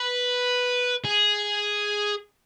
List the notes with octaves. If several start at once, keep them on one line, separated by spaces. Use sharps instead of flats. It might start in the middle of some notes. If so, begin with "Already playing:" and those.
Already playing: B4
G#4